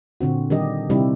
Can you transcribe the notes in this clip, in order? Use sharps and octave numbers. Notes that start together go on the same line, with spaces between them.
A#2 D3 C4 F#4
D#3 G3 D4 G4 D#5
C3 G3 C4 D#4 E4 G4